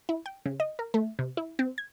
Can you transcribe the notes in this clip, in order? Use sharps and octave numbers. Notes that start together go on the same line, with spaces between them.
E4
G5
C#3
D#5
A#4
A3
C3
E4
C4
G#6